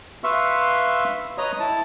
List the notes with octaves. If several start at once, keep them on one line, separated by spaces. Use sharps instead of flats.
B4 E5 F5 C6 C#6 E6
B4 C#5 D#5 A#5 D#6
E4 A5